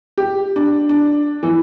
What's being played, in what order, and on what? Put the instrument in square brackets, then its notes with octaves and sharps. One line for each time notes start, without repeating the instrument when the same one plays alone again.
[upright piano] G4
D4
D4
E3